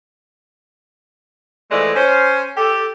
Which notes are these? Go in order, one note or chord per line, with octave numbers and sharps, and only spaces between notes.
E3 F3 G#3 A3 D5
C#4 C5
G4 A4